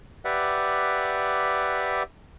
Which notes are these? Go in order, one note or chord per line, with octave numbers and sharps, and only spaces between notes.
G4 B4 D5 E5 F#5